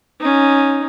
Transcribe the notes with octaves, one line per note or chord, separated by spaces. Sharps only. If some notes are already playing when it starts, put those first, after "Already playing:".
C#4 D#4